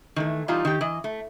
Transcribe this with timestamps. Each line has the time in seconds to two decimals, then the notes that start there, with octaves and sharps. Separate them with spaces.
0.16 D#3 E3 A3
0.48 E3 G3 D#4 F4
0.65 D#3 G4
0.81 E3 D#5
1.04 A3